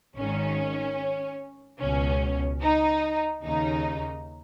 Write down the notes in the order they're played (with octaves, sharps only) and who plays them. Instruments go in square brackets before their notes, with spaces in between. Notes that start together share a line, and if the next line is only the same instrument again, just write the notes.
[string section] G#1 G#2 D#3 C#4
C#2 B2 C#4
D#4
D#2 C#3 D#4